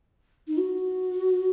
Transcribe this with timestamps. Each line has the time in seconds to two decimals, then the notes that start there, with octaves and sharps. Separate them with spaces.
0.47 D#4
0.58 F#4